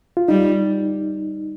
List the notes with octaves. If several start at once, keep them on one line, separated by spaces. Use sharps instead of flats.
F4
G3 D#4